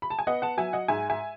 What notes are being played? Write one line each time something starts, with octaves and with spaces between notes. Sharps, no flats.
B5
A5
G#5
B3 D#5 F#5
F#5 A5
F#3 E5 G#5
D#5 F#5
G#2 E5 G#5
E5 G#5